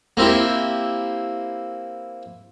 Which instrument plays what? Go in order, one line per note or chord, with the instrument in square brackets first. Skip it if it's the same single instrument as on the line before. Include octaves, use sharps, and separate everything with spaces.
[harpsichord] A#3 C4 E4 G4